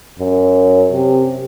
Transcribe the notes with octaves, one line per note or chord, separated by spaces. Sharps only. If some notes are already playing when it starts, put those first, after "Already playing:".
F#2
C3